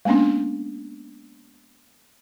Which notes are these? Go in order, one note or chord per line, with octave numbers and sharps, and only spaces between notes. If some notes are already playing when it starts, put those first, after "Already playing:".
G#3 A#3 B3 C#4 D4